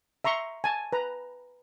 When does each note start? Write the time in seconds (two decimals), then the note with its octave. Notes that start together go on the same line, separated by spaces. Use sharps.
0.24 E5 A#5 C6 C#6
0.64 G#5 A5
0.93 B4 A#5